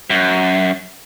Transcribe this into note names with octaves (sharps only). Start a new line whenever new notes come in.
F#2